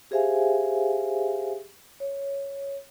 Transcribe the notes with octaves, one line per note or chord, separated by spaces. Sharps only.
G4 G#4 C5 E5 F5 G#5
C#5